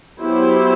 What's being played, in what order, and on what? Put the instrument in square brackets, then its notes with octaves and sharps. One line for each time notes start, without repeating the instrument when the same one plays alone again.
[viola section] F#3 B3 E4 G4 C5